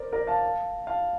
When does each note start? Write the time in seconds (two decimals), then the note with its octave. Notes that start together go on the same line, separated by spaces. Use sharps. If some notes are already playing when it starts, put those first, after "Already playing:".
Already playing: A#4 C5 D5
0.13 A#4 D5
0.27 F5 A5
0.87 F5 A5